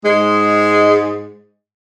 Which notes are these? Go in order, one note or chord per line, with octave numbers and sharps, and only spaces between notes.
G#2 G#3